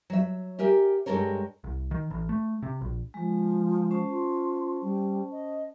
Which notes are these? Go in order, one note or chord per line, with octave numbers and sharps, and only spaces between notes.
F#3 E5
G4 A#4 E5 G#5
G2 A#2 G#3 A4 A#4 C#5
C2
D#3
A1
A3
C3
A#1
F3 G#3
C#4 C5 A5
F4
G3
D#5